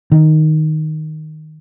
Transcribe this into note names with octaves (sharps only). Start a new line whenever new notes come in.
D#3